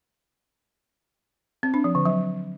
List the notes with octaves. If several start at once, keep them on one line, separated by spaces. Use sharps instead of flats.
C4
D4
F3
D3
F#3